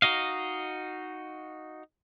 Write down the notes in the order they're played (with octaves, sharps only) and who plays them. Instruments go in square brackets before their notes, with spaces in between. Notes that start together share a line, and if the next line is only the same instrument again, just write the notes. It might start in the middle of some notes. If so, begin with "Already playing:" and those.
[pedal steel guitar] D#4 F#4 D#5 F5